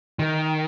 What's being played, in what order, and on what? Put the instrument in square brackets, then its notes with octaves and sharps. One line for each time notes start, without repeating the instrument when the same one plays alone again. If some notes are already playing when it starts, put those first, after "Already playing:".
[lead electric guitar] D#3